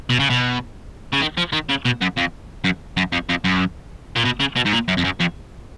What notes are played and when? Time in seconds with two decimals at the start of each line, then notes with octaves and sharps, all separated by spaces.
0.10 B2
0.19 C#3
0.30 B2
1.13 C#3
1.21 D#3
1.38 F3
1.53 D#3
1.70 C#3
1.85 B2
2.01 F#2
2.17 F2
2.64 F#2
2.97 F#2
3.12 F2
3.29 F2
3.44 F#2
4.16 A#2
4.25 B2
4.40 C#3
4.56 B2
4.66 G#2
4.73 A#2
4.88 F#2
4.97 F2
5.04 F#2
5.20 F2